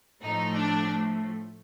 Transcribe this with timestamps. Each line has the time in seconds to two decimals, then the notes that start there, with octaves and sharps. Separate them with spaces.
0.23 A2 F3 A3 D#4
0.55 D4